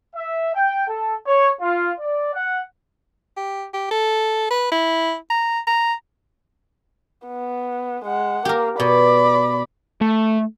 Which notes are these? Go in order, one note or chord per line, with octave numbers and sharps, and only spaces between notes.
E5
G5
A4
C#5
F4
D5
F#5
G4
G4
A4
B4
E4
A#5
A#5
B3
G#3 F#5
A#3 G4 A#4
B2 D5 B5
A3